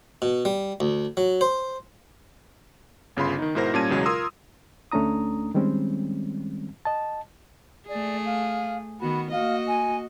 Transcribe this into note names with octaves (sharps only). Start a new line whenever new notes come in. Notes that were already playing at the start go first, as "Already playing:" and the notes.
B2
G3
D2
F#3
C5
G1 C#3 F4 B5 C6
D#3 D#4
G#2 B2 E4 A#4 C5 A#6
A#2 G3 C#4 A5 G#6 D#7
B1 E2 C#3 F#3 G#3
F4 A#4 C6 D#6 E6
D2 A3 C#4 D4 A#5 D#6
D#3 G3 G#3 C4 C#4
D#5 A5
A3 G#4 D5
F5
D#3 B3 F#4 B5
A#3 F#4 D#5 F5
G#5